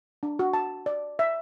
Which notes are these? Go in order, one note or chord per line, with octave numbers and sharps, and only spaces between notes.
D4
F#4
A5
D5
E5